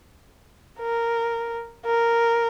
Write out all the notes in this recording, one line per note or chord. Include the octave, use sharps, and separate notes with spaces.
A#4
A#4